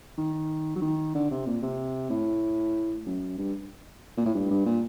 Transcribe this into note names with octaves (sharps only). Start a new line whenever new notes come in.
D#3
F#3
D#3
D3
C3
A#2
C3
A2
F#2
G2
A#2
A2
G2
G2
A#2